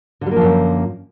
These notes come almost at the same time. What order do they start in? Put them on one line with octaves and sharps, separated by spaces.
D3 G3 A#3 F3 F#2